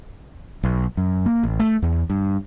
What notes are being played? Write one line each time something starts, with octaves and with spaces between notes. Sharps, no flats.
B1
F#2
A#3
A1
A3
E2
G2